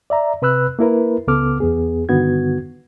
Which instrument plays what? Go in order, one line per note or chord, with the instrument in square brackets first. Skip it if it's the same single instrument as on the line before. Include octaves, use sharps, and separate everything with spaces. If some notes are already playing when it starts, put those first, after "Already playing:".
[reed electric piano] D5 E5 A#5
C3 B4 B5 E6 F#6
A#3 E4 A#4 B4
C#2 C#3 B3 A4 D6 F6
E2 B3 G#4
G2 D3 D#3 B3 F#4 G#6